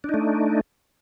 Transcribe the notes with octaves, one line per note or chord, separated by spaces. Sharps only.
A3 D4 D#4